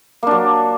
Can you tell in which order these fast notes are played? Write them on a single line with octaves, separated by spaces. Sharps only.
A#3 D4 F#3